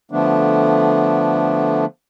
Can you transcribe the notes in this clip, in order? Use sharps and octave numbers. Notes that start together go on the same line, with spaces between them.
D3 F3 A3 B3 D4